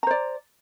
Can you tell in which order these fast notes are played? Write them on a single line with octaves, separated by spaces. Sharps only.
A#5 C5 D5